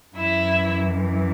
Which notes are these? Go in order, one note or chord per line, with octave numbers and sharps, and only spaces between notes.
F#2 E3 E4 E5